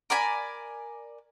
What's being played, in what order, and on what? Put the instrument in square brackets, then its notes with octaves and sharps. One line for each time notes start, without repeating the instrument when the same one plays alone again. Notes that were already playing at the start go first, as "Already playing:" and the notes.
[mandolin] A#4 D5 G#5 B5